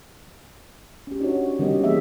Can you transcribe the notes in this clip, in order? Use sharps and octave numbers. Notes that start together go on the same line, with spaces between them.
C#4 G4
D4 D#4 F#4 C#5
D#3 G3 B3 C#4 G4 D#5
D#3 E3 A#3 G#4 D#5 E5